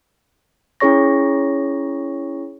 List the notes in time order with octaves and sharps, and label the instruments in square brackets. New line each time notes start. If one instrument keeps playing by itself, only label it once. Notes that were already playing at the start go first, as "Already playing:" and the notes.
[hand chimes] C#4 E4 G#4 C#5 C#6 A#6